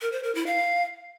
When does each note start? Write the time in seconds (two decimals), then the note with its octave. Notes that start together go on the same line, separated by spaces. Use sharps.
0.01 A#4
0.12 C5
0.23 A#4
0.35 E4
0.46 F5